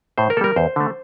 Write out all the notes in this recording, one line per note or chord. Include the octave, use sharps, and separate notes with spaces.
A2 C5
A#4
G3 A#3 A4 A#4
E2 C5
D3 A3